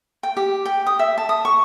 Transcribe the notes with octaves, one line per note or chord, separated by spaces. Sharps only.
G5
G4
G5
D#6
E5
A5
D#6
C#6